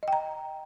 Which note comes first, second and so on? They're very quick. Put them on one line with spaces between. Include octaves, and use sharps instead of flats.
D#5 G5 A#5